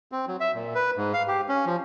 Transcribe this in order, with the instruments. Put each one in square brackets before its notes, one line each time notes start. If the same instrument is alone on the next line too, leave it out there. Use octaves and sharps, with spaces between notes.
[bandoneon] C4
F#3
E5
A#2
B4
G#2
F5
G4
C#4
F3